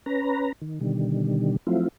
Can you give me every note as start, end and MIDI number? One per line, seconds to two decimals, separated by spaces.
0.06 0.52 61
0.06 0.52 71
0.06 0.52 82
0.62 0.80 51
0.80 1.56 47
0.80 1.56 50
0.80 1.56 51
0.80 1.56 55
1.67 1.88 53
1.67 1.88 54
1.67 1.88 57
1.67 1.88 60
1.67 1.88 64
1.67 1.88 65